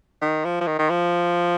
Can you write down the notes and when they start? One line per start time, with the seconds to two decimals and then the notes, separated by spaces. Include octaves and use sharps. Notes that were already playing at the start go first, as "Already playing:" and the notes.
0.21 D#3
0.45 F3
0.61 F3
0.67 D#3
0.79 D#3
0.90 F3